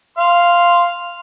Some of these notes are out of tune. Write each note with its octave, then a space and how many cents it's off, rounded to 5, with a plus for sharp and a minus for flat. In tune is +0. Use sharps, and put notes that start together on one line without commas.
F5 -5 C6 +0